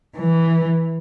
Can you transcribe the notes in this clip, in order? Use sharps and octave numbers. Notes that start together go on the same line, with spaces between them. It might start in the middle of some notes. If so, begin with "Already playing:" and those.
E3